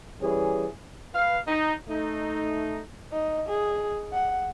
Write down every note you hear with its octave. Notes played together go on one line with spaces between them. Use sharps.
E3 G3 C#4 G#4
B4 F5
D#4
A3 D#4
D#4
G#4
F#5